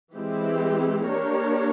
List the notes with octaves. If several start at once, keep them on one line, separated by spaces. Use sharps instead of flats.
E3 G#3 C4 E4 G4
A#3 D4 G4 A#4 C#5